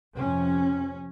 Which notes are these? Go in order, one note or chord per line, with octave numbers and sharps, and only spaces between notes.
F2 C3 C#4